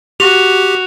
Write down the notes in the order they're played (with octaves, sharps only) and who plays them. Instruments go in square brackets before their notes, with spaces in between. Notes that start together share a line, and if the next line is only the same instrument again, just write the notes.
[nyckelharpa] F#4 [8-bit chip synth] G4 [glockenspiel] F7